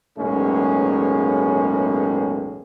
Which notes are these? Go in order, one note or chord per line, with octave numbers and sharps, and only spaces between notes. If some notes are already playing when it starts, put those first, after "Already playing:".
B1 E2 A2 G#3 A#3 C#4